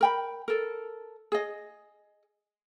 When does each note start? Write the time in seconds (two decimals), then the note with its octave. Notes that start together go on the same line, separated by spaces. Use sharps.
0.01 A#4 G5 B5
0.48 A4 A#4
1.32 G#4 D#5